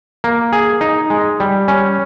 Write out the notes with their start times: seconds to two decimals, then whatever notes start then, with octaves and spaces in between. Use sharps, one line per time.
0.24 A#3
0.53 G#4
0.81 D#4
1.10 G#3
1.40 G3
1.68 C#4